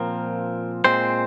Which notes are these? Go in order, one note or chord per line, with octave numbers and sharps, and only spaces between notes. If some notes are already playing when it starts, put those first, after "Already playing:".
Already playing: A#2 F3 C4 A#4
A#2 G#3 C4 C5